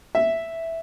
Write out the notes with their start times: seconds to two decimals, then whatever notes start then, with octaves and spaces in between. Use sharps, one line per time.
0.15 E5